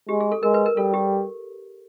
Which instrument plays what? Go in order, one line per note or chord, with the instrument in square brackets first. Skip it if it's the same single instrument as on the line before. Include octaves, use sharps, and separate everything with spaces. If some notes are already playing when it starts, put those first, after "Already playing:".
[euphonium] G#3 [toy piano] G4
[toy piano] G#4
A4
[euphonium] G#3 [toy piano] A#4
[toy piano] B4
A#4
[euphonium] G3 [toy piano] A4
[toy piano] G4